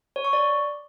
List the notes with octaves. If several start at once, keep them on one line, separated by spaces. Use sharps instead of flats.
C#5
C#6
D5